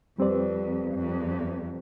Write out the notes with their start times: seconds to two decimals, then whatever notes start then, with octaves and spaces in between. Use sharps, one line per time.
0.18 F2 G3 C4 G4 B4 D5
0.94 F2